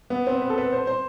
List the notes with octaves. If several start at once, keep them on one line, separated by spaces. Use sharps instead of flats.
B3
C4
B4
A4
B4
C5
C5